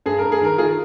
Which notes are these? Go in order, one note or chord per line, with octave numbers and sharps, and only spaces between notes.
G2 G#4
A#4
G2
G#4
D#3 A#4
D#3 F4 G#4